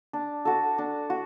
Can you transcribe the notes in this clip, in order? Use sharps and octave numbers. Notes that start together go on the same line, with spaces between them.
D4
F#4 A4
D4
F#4